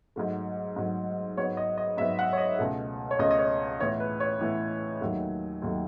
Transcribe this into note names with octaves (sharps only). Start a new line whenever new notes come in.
G#2 F#3 A3
G#2 F#3 A3
G#2 F#3 B3 C#5
D#5
D#5
G#2 F#3 B3 E5
F#5
C#5
D#5
C#2 B2 A3
C#5
C#2 B2 A3 D#5
D#5
C#5
A2 E3 B3 C#5
B4
C#5
A2 E3 B3
D#2 D#3 F#3 A3
D#2 D#3 F#3 A3